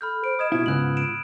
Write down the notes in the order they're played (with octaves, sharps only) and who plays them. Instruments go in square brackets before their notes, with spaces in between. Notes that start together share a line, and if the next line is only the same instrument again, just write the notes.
[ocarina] A4 [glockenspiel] B5 F6 G6
[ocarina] C5 [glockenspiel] D7
[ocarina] D#5 [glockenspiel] D#6 G#6 E7
[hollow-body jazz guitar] B2 E4 [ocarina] F4
[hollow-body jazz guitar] G#2 C#3 B3 [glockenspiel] E6 F#6 F#7
[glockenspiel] D7 E7